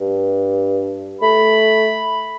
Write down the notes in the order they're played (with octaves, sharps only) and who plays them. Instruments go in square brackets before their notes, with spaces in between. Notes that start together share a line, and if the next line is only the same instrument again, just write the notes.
[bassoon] G2
[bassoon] A3 [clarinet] B5